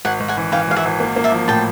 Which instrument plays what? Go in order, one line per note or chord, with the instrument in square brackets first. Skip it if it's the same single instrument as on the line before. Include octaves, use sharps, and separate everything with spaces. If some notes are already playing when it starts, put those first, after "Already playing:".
[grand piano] G#1 [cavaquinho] F#5 G#5
[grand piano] G#1
[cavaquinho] F#5 G#5
[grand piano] E3
[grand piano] E3 [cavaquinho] F5 G5
[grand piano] G#1 [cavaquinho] F5
[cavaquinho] E5 F#5
[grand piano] G#1
A#3
A#3
[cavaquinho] D5 E5
[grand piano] F3
[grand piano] A2 [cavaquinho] G5 A5